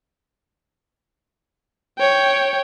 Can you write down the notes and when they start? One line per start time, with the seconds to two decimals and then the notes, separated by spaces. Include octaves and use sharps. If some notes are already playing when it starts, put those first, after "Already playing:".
1.99 C#5 G5